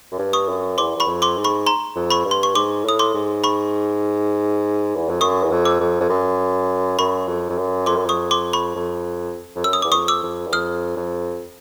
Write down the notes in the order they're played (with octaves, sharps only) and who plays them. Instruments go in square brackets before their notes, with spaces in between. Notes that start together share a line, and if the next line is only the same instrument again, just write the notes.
[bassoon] F#2
G2
[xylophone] C#6 D#6
[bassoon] F#2
[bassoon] E2 [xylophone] C6 D6
[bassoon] E2 [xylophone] B5 C#6
[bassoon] F2
[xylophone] C6 D6
[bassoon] G#2
[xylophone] B5 C#6
A#5 C6
[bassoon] F2
[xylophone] B5 C#6
[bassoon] G2
[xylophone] C6
C#6
[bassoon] G#2 [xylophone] C6 D6
[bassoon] A2 [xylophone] D#6
[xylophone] C6 D6
[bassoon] G#2
[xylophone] B5 C#6
[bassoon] E2
F2
[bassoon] F#2 [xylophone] C#6 D#6
[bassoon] E2
F2
[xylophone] D6 E6
[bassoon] F2
F2
F#2
[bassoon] F#2 [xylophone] B5 C#6
[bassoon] F2
F2
F#2
[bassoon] F2 [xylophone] C6 D6
[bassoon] F#2
[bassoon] F2 [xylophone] C#6 D#6
[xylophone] C6 D6
B5 C#6
[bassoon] F2
F2
[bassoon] F#2 [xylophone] E6
[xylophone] D#6
[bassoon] E2 [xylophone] D6
[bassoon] F2 [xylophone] C#6 D#6
[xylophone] D6 E6
[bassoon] F2
E2
[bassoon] F2 [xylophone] D#6 F6
[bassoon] F2